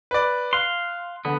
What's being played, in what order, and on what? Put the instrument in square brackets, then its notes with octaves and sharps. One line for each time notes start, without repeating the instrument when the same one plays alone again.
[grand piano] B4 D5
[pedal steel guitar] F5 C6 [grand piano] F#6
[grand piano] D3 [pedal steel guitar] B3